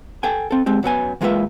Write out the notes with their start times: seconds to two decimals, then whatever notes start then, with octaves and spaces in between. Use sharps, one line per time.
0.23 A4 G5 G#5
0.51 C4 A4
0.66 G#3 C4 G4
0.83 F#2 F#3 B3 G#5
1.21 E3 G#3 A#3 F4 B4 E5